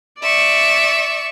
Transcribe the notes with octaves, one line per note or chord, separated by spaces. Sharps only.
D5 E5 C#6